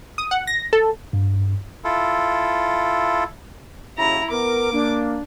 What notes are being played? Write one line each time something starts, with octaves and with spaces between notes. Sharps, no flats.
D#6
F#5
A#6
A4
G2
E4 F4 A4
D#2 C#3 F#3 E4 A#5
B3 A#4 D6
A#3 D4